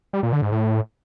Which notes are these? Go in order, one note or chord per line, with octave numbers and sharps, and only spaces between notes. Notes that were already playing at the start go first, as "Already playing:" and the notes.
G3
A#2
D3
G#2
A2